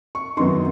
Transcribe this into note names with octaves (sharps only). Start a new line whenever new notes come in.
C#6
F#2 D#3 F#3 B3 D#4 C6